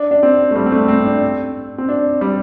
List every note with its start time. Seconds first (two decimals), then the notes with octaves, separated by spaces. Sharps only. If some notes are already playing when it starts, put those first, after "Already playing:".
Already playing: D4
0.11 D4
0.23 C4
0.51 A3
0.56 G3
0.66 C4
0.72 A3
0.88 C4
1.05 D4
1.78 C4
1.89 D4
2.21 G3